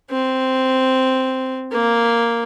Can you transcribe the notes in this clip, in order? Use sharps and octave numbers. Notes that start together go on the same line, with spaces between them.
C4
A#3